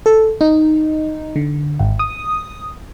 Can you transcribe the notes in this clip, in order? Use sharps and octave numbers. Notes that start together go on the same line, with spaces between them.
A4
D#4
D3
G#1
D#6